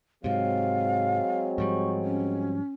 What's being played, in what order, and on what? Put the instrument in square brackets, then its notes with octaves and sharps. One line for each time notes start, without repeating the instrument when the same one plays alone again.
[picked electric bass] G#2 C3 [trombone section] F#3 G#3 C4 [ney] F5
[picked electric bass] G#2 F3 G3 [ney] C#6
[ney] C#4